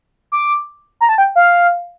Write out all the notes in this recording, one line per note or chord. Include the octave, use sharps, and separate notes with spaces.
D6
A#5
A5
G5
F5